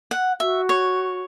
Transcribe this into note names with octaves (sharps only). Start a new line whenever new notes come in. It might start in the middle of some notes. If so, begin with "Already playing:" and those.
F#5
F#4 E5
C#5